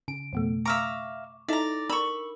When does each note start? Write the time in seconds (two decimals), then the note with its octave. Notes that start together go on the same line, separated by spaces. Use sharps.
0.08 C#3 D7
0.33 F2 B2 A3
0.65 E5 F5 A#5 C#6 D6
1.48 D#4 E4 A4 D5 A#5
1.89 D4 A#4 B5 C#6 E6